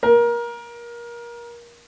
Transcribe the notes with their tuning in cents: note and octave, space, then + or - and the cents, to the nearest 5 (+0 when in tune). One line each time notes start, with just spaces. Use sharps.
A#4 +25